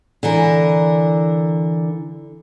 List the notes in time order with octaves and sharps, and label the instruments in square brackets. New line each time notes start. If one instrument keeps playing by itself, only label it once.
[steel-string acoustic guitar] D3 E3 A#4